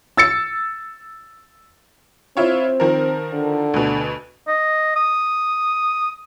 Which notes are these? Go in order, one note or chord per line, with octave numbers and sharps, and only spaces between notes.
E6 A6 C#7
C4 E4 F4 C#5
D#3 F3 A#4
D3
D2 B2
D#5
D#6